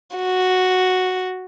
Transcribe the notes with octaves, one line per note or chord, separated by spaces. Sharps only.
F#4